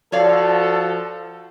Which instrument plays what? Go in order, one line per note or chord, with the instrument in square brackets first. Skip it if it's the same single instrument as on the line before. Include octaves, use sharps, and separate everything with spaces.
[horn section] F3 F#4 A4 [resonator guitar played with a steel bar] C#5 D5 F5